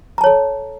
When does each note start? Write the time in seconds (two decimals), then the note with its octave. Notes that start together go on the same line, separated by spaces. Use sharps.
0.18 A#5
0.21 A5
0.24 C#5
0.27 A4